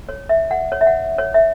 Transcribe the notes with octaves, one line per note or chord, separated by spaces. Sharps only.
C#5
E5
F#5
C#5
E5
F#5
C#5
E5